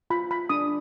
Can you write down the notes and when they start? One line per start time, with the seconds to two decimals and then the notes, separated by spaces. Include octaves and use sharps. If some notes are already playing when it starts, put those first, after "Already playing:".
0.10 F4 B5
0.31 B5
0.49 D4 D#6